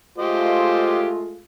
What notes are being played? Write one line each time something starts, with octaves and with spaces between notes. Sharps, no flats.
G#3 A3 F4 G4 C5 D#5